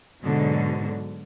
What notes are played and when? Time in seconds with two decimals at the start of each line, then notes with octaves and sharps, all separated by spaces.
0.23 G#2 B2 D3 F#3